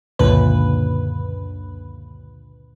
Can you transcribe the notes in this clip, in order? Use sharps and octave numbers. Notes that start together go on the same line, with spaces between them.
C#2 F#2 A#2 D3 B4